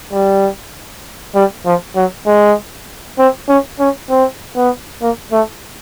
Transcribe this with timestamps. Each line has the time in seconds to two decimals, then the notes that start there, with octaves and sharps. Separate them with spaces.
0.12 G3
1.35 G3
1.66 F3
1.96 F#3
2.27 G#3
3.18 C4
3.49 C#4
3.80 C#4
4.10 C4
4.56 B3
5.02 A#3
5.32 A3